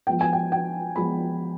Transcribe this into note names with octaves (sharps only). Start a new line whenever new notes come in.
F3 G#3 B3 G5
G#5
G5
G5
F3 G#3 B3 B5